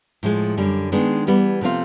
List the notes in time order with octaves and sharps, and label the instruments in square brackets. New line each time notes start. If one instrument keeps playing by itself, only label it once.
[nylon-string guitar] A2 F3 G#3
F#2 D3 G3
D#3 G#3 B3 D4
E3 G3 B3
C3 F3 A3 C4 F4